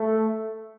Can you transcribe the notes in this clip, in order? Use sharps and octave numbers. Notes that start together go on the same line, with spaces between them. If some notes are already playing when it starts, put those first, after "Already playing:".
Already playing: A3